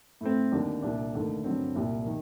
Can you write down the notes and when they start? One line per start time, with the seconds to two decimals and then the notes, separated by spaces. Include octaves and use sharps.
0.21 A2 A3 C4
0.52 D#2 D3 G3 D4
0.82 C2 A#2 G3 D4
1.14 D#2 D3 A3
1.44 G2 D3 F#3 C4
1.75 C2 A#2 G3
2.06 D#3